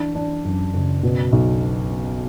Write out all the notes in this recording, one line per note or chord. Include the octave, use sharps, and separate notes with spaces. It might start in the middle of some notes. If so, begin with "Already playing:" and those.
Already playing: E3 D4
E3 D4
F#2
F#1
B2
B1